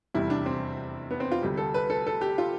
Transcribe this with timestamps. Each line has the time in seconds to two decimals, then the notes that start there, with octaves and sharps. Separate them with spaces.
0.14 F1 E2 C3 G3 E4
0.30 D4
0.46 C4
1.11 B3
1.20 C4
1.31 F4
1.42 D2 C3 G3
1.57 A4
1.74 B4
1.90 A4
2.07 A4
2.21 G4
2.38 F4